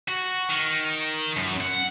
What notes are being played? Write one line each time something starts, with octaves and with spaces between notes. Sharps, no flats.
F#4
D#3
F#2
F#5